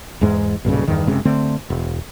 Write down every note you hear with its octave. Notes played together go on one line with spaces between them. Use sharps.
E2 G#2 G#3
B1 G2 A#2 C#3
E2 G2 D#3
F#1 C3 G#3 C#4
D3 A3 C4
E1